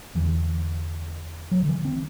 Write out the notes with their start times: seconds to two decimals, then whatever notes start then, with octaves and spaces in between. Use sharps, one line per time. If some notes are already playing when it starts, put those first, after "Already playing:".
0.15 E2 D3 E3
1.51 F#3
1.62 D3
1.69 E3
1.85 C4